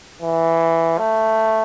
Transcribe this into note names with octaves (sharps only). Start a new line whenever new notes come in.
E3
A3